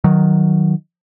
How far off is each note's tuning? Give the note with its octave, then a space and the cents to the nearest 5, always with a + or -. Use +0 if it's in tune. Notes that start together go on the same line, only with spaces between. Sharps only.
D#3 +0 F#3 +0